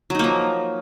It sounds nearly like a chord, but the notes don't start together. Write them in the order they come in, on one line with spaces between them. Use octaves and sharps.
F#3 D#4 A#3 F3